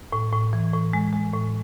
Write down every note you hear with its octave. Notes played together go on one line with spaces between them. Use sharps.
A2
A2
E3
A2
G#3
G#3
A2